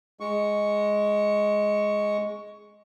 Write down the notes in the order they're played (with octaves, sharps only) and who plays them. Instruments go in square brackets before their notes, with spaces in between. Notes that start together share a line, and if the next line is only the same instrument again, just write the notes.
[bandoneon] G#3 C#6